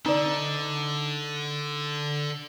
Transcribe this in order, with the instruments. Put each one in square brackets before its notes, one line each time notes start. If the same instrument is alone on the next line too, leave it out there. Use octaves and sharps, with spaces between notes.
[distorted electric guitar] D3 [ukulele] D#4 D5